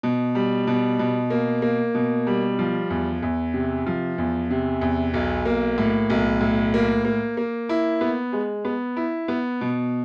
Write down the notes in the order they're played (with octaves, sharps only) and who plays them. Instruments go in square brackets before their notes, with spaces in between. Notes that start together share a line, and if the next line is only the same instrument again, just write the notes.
[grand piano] B2
G3
B2
B2
A#3
A#3
B2
G3
F3
E2
E2
C3
F3
E2
C3
E2
B1
A#3
A2
B1
A2
A#3
A#3
A#3
E4
B3
G#3
B3
E4
B3
B2